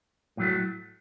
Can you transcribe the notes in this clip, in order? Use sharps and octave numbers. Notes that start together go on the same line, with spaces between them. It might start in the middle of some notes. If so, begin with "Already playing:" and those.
A2 F#3 A3